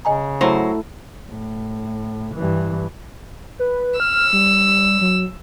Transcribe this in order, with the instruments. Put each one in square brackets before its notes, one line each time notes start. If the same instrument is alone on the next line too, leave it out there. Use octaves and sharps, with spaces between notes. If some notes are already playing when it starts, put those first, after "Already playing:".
[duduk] C#3 [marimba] D#5 G#5 A#5
[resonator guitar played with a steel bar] F#3 C5 [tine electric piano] A3 E4 A4
[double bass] A2
G2 E3
[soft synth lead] B4
[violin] E6 [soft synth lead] F6
[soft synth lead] G3
F#3